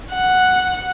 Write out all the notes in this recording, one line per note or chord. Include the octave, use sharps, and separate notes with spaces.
F#5